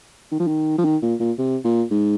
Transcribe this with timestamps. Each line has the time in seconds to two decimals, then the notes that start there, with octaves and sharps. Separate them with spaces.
0.31 D#3
0.40 F3
0.47 D#3
0.78 F3
0.84 D#3
1.02 A#2
1.20 A#2
1.38 C3
1.64 A#2
1.91 G#2